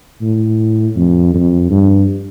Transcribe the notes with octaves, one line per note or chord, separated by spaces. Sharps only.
A2
F2
F2
G2